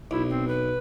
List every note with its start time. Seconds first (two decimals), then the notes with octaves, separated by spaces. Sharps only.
0.11 B1 E4
0.30 C4
0.48 B4